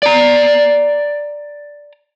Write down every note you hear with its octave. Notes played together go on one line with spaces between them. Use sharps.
D5 A#5